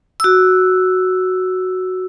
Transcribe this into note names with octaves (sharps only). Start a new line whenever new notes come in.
F#4 E6